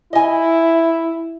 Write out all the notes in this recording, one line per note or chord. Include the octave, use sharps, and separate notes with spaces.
E4 D#5 G#5